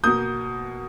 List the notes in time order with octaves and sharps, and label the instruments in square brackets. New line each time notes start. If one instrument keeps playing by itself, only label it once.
[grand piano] B2 A#3 D#6 G6